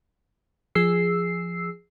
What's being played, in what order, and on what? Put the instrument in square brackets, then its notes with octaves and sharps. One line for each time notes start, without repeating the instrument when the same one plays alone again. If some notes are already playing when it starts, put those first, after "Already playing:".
[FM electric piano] F3 G#4 E6 C7